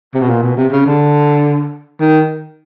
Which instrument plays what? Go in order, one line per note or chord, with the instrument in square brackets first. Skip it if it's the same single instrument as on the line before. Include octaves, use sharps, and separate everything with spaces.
[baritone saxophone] C3
B2
A#2
B2
C3
C#3
D3
D#3